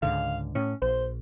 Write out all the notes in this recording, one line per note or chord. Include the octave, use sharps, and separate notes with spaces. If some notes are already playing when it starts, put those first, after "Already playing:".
C#2 G#2 D3 F5
A2 C#4
A#1 C5